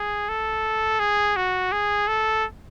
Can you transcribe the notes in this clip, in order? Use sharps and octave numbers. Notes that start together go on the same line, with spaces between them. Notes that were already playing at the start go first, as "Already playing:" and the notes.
Already playing: G#4
A4
G#4
F#4
G#4
A4